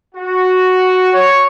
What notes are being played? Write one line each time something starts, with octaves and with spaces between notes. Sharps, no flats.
F#4
C#5